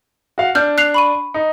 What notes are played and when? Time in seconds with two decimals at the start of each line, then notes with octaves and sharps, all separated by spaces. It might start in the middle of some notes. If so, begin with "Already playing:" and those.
0.38 F#4 F5
0.55 D4 F6 G6
0.78 F#6 C7 F7
0.94 B5 C#6 D#7
1.34 D#4